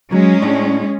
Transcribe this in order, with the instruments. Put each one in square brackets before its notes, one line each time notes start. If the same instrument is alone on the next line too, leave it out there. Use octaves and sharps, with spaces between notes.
[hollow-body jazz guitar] F#3 [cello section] G#3 C#4
[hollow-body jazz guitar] A2 D4